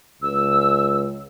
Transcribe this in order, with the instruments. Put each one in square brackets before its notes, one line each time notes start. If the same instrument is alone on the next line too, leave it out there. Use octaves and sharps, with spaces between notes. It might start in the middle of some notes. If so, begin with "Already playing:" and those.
[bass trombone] C#2 [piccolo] E6